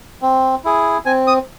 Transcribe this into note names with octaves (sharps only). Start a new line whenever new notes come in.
C4
E4 G#4
C4 G#5
D#6